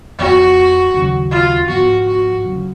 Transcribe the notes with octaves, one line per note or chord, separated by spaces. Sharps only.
F2 F3 B3 F#4
D#2 C#3 F#3
F4
G#2 F3 B3 F#4
F#4
F#1 F#2 C#3